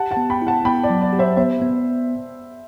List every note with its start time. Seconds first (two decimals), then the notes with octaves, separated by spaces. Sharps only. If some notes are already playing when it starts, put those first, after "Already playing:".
Already playing: G4 F#5 A5
0.11 F#5 A5
0.17 B3
0.30 G5 B5
0.42 E4
0.47 F#5 A5
0.65 B3 G5 B5
0.84 D5
0.90 F#3
1.02 D5
1.13 G4
1.19 C5 E5
1.37 B3 C5 E5
1.62 B3